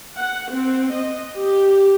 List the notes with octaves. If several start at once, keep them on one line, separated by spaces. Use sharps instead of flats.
F#5
C4
D#5
G4